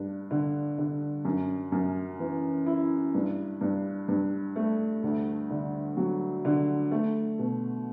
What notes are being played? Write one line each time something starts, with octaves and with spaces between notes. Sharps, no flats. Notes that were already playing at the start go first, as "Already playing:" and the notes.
Already playing: G2
D3
D3
F#2
F#2
E3
E4
G2
G2
G2
A3
D2
D3
F#3
D3
A3
B2